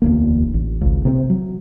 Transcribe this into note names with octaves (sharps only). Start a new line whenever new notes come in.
E1 D2 A#3
A1
G#1 C#2
C3 B3 C4
F#3